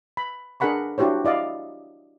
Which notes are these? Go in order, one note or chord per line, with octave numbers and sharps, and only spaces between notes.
B5
D4 G#4 A#4 F#5 B5 C#6
D4 E4 F#4 G4 C5 C#5
E4 D5 D#5 F5